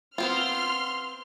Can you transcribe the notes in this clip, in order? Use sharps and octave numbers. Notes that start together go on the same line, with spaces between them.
B3 C4 F4 C6 F6